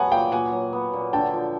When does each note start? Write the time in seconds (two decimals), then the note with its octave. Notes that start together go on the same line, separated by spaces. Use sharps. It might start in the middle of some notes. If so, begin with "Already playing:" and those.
Already playing: F#3 B3 F#5 G#5 A5
0.11 A#2 F5 G5
0.32 A#2 F#5 G#5
0.52 F#3
0.73 B3
0.93 A#2
1.13 D3 G5 A5
1.34 F3